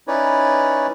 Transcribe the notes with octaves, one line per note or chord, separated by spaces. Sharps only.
C#4 D#4 E4 B4 C#5 D5